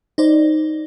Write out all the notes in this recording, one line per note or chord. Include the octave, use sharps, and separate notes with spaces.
D#4 C5 D5